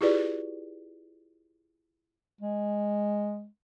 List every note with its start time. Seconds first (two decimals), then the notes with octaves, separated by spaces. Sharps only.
0.01 E4 F4 G4 G#4 B4 D5
2.41 G#3